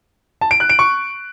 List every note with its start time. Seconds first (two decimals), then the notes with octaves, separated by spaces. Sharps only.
0.41 A5
0.51 D7
0.60 F#6
0.70 D7
0.79 C#6